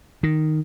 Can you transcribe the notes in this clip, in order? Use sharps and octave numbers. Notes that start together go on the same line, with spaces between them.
D#3